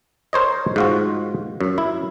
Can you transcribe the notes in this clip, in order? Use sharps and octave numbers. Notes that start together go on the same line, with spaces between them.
A#4 C5 C#5 D#5
G#2 F4 F#4
F#2
E4